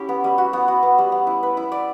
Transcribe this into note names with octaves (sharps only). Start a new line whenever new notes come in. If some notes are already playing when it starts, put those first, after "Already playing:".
Already playing: C#4 E4 G4
B3
G3
F#4
B3
F#4
B3
G3
B3
E4
B4
E4
D5